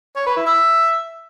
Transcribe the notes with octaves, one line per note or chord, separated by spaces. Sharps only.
C#5
B4
E4
E5